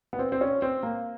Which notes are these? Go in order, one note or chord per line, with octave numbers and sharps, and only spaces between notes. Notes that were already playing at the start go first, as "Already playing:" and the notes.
B3
C4
C4
C#4
C4
A#3